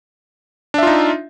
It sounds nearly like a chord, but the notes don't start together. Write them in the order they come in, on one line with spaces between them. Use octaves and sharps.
D4 E5 F4 D#4